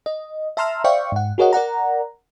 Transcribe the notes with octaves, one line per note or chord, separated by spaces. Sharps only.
D#5
E5 A5 A#5 C6 E6 F6
C5 D5 E5 F5 G5 C#6
G#2 F#5
F#4 G#4 A#4 C#5 D#5 F#5
A#4 D5 F#5 A#5